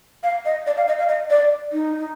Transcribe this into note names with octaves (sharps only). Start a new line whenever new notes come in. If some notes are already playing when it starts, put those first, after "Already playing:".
F5
D#5
D5
F5
D#5
F5
D#5
D5
D#4